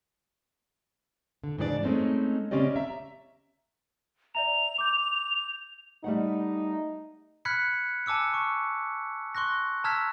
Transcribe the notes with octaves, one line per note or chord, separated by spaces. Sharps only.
D3
G#2 C#3 E3 D4 A4 D5
G#3 A3 C4 C#4 D#4
C#3 C4 C#4 G4 D5 D#5
E5 A#5
D5 E5 A#5 F7
D6 G6
G3 A3 D#4 F#5
B5 F6 F#6 G#6 B6 C#7
G#5 A5 D6 E6 C#7
C#6
C6 C#6 F#6 A#6
A5 A#5 E6 F6 G#6 B6